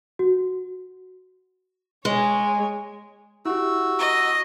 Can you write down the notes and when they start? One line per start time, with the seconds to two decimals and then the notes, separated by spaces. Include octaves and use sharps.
0.19 F#4
2.05 G#3 C#5 G#5
3.46 E4 F#4 G4 E6
3.99 D#5 A#5